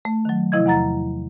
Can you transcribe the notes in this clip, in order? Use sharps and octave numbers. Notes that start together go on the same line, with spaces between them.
A3
D#3 F#3
C3 F3 E4 D#5 G#6
E2 F#5 A#5 A6